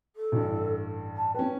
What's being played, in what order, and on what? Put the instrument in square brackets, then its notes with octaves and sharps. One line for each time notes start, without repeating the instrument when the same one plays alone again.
[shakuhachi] A4
[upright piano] A1 G2
[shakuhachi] A5
[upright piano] C#4 B4 [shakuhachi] G5